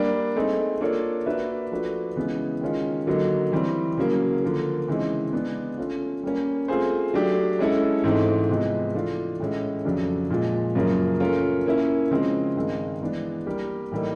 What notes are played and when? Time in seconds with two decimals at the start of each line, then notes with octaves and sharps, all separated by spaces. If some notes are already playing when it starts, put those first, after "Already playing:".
Already playing: G3 A#3 D4
0.36 A3 C4 D#4 G#4
0.81 A#3 D4 F4 A4 C#5
1.26 A#3 D4 F#4 B4 E5
1.72 F3 A3 D4 F#4 B4
2.16 C#3 E3 G#3 B3
2.61 D#3 G#3 C#4 F4
3.07 D3 F#3 A#3 D#4
3.52 E3 G3 C4
3.98 C#3 F#3 A#3
4.42 D3 F3 A#3
4.88 C#3 E3 G#3 C4 D#4
5.33 G#3 B3 D4
5.78 A3 C#4 F4
6.23 G3 A#3 C#4
6.68 A3 C4 F4 G#4 C5
7.14 F#3 A3 D4 G4
7.59 G#3 C#4 E4 A4
8.04 G#2 E3 A3 C4 D#4
8.49 C3 F3 G#3 B3 D#4
8.94 E3 A3 D4 F4
9.40 A2 E3 G#3 C#4
9.85 F2 C#3 F#3 A3 D4
10.30 A#2 F3 G#3
10.75 F#2 C#3 F3 A#3
11.20 A3 C#4 F4 A#4
11.66 A#3 C#4 E4
12.11 C#3 F3 G#3 C4
12.56 G2 D#3 G#3 C4
13.01 E3 G#3 B3 D4
13.46 G3 A#3 D4 G4 A#4
13.92 A2 E3 G3 A#3 D#4